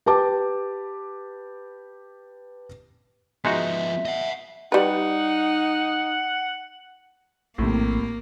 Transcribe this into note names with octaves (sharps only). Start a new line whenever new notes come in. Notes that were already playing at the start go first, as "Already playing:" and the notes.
G4 B4 A5 D6
F3 G#3 B3 D#4 F#4 E5
D#5 F#5
G3 D#4 B4 F#5
A#1 A2 C3 A#3